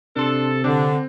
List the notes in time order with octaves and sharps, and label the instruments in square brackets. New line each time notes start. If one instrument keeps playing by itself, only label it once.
[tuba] C3 [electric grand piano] D4 C6 [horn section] A4
[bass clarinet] D3 [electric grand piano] C4 [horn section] D4